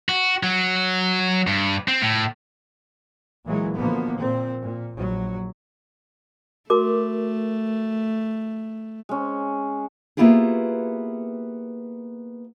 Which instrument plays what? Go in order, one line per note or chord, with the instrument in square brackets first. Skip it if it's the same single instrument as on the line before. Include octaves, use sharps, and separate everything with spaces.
[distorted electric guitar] F#4
F#3
G2
C4
A2
[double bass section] A#2 E3 F#3 G#3
B2 D3 F3 A#3 B3
A#2 C4
A#2
A#1 F#3
[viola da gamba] A3 [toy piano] F#4 A#4 D6
[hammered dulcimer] G#3 C#4
[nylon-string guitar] A#3 B3 E4 F4 G4 G#4